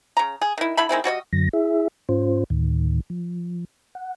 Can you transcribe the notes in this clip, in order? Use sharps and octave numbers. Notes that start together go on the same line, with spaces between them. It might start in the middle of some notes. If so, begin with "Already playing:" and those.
C#3 A#5
G#4
D#3 E4
D3 E4 E5 B5
D#3 G#3 C4 E4
G3 F#4 C#5 D#5
F#2 D3 F#3 A#6
E4 G#4 E5
G#2 C#4 F4 C5
D2 A2 D#3
F3
F#5